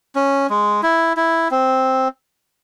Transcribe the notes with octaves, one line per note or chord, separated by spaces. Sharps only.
C#4
G#3
E4
E4
C4